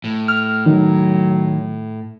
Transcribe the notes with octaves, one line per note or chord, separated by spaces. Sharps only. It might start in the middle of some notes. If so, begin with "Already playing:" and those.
A2
F6
D#3 F#3